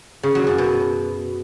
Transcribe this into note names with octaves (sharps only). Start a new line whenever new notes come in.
C#3
F#3
F#2
B2